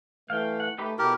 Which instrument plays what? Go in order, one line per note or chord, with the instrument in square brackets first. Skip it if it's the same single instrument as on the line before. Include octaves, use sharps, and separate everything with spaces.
[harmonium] E3 A3 [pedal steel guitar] F5 G5
[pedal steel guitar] F#5
[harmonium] A3 [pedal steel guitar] D#4 G4 B4
[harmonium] B2 E4 [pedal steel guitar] F#3 A4 [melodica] G4 A#4